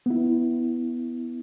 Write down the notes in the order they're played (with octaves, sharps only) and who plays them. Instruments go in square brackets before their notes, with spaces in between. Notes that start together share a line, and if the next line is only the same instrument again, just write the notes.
[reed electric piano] B3 E4